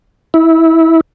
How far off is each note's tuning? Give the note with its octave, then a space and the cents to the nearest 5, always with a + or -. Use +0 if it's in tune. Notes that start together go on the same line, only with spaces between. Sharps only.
E4 -20